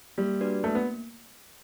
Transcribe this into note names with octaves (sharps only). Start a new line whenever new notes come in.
G3 A#3
D4 F#4 B4 D5
A3 A#3
B3